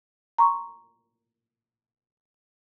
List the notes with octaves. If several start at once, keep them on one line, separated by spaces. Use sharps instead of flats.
A#5 C6 C#6